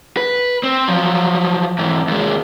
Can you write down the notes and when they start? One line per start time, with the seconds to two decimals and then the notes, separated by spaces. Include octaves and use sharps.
0.17 B4
0.63 C4
0.88 F3 F#3
1.79 G#2 E3
2.07 D#2 G#3